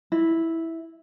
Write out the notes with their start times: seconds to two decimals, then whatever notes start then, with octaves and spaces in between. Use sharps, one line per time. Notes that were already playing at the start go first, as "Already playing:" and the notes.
0.12 E4